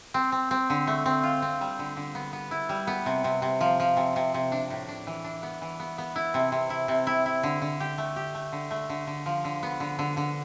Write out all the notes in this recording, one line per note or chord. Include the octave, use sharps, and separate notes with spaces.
C4
C4
C4
D3
A3
C4
F4
C4
G3
D3
D3
B3
B3
E4
G3
B3
C3
C3
C3
F3
F3
C3
C3
C3
D4
A2
D4
E3
D4
B3
E3
B3
B3
E4
C3
C3
E4
C3
E4
E4
D3
D3
G4
A3
G4
A3
D3
A3
D3
D3
F3
D3
B3
D3
D3
D3